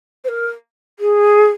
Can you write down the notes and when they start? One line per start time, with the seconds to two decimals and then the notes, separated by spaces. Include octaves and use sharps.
0.24 C5
0.28 A#4
0.99 G#4